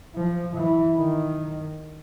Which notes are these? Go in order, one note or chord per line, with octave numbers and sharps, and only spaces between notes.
F3
E3
D#3